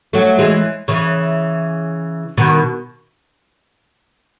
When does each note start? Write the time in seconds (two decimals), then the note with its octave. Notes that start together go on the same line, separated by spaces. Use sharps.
0.13 F#3 A3
0.39 E3 G#3
0.88 C#3 E3
2.38 B2 D#3